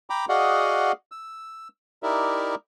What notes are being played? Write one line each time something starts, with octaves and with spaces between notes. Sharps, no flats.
G5 A#5 B5 D6
F#4 G#4 D5 D#5 F5 F#5
E6
D#4 E4 G4 A#4 D5 E5